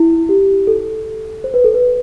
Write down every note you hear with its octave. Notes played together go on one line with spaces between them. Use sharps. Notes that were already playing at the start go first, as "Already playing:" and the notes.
Already playing: E4
G4
A4
C5
B4
A4
B4